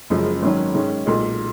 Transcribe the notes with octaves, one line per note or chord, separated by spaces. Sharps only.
F#1 F#2 C#3 F3 G#3
G#1 G#2 D#3 F#3 C#4
G#2 D#3 G#3 C#4
B1 A#2 G#3